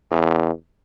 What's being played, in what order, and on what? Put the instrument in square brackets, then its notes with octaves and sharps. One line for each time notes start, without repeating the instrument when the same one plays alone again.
[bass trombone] E2